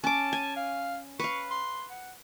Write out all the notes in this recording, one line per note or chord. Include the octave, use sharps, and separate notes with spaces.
C#4 A5 D6
G#5
F5
B4 F5 C#6
C6
F#5